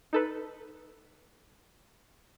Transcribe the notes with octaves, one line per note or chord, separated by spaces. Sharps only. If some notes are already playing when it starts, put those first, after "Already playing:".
D#4 A4 B4